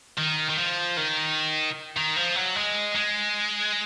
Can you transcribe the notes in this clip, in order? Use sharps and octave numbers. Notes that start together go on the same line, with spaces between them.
D#3
D#3
F3
D#3
D#3
F3
F#3
G#3
G#3